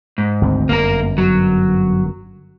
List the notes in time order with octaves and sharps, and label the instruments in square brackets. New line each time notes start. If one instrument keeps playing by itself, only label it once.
[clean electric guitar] G#2
[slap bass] G#1 D2 C4
[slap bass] G1 F#2 [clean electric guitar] A#3 A#4
[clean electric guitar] F#3